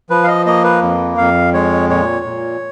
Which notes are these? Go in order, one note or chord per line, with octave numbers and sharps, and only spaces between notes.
F3 B4
F5
D#5
A#3 D#5
B4
F2
F2 F5
G#3 C#5
A#2 C#5
A#2